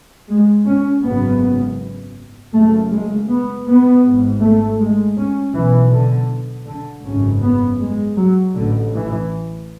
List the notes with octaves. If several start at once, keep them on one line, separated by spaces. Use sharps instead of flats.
G#3
C#4
G#1 F#2 C#3 B3
F#1 F#2 C#3 A3
G#3
B3
B3
G#1 G#2
A3
G#3
C#4
B1 B2 E3
D3
D3
G#1 F#2 C#3 C#4
B3
G#3
F#3
A1 A2 D3
E3